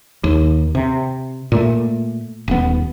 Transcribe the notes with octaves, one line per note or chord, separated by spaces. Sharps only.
D#2
C3
A#2 A3
D#1 B3